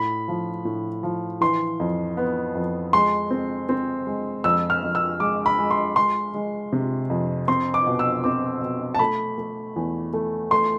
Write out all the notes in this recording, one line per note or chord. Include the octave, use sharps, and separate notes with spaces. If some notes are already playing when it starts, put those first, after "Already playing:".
Already playing: A2 B5
F3
A2
F3
E3 C6
F2
B3
F2
G#3 C6
C4
C4
G#3
F2 E6
F6
F2
E6
G#3 D6
B5
G#3
C6
G#3 C6
G#3
C3
F2
C4 C6
D6
B2
E6
C4 D6
B2
A5
A3 B5
A3
E2
A3
A3 C6